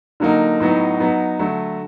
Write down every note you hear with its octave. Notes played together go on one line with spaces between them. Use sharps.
D3 F#3 A#3 D#4
A2 F#3 B3 D#4
F#3 B3 D#4
D3 F#3 A3